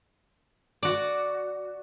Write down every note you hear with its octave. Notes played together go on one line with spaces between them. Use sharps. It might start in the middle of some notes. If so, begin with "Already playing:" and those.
F#4 D5